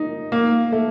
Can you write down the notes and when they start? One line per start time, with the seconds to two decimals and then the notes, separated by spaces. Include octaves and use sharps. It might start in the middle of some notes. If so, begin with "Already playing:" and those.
Already playing: D#4
0.32 A#3
0.72 A3